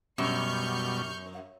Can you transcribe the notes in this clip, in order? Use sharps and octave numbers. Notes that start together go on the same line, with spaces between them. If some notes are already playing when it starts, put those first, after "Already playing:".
F#2 B2 G3 C#6 F6 G6